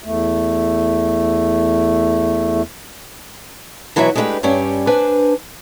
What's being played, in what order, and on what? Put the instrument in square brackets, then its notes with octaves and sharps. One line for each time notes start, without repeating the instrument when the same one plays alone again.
[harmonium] E2 A3
[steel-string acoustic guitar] B2 E3 F#3 F#4 D#5 E5
G#3 A3 D4 E4 G4 B4
G2 G3 C#4 D5
D4 B4 C5 G#5